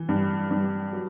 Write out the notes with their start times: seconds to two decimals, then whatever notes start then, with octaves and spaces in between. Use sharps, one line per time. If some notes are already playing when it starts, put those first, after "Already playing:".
Already playing: E3
0.09 G2
0.51 G2
0.93 F#3